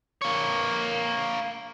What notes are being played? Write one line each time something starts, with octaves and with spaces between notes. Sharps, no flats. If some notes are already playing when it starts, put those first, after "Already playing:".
A#3 C#5